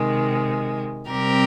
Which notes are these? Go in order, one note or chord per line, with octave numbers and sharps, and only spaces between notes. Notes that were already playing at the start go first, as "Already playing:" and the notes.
Already playing: C3 D#3 G#3
C3 G3 C4 G4 A#4